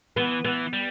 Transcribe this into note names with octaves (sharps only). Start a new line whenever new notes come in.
E3 B3
E3 B3
G3